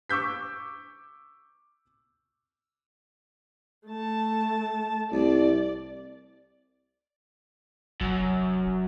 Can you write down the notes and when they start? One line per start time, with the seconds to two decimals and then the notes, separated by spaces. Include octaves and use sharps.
0.10 C#6 D6 E6 G6 B6
3.87 A3 A5
5.12 C2 D5
8.01 F1 F#2